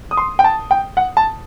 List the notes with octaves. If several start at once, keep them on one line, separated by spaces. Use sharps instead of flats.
D#6
C6
G5
A5
G5
F#5
A5